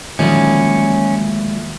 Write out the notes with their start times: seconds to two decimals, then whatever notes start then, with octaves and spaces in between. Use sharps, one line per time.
0.19 D2 A#2 D#3 F3 F#3 G#3 C#4 D5